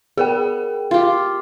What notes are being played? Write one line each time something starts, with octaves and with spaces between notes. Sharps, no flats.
B3 G#4 A#4 G5
F4 G4